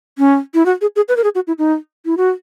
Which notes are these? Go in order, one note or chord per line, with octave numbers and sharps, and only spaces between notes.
C#4
E4
F#4
G#4
G#4
B4
A#4
G#4
F#4
E4
D#4
E4
F#4